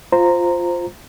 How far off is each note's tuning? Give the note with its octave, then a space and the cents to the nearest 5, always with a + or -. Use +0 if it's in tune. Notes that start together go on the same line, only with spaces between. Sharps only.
F4 +0 C5 +0 A#5 -10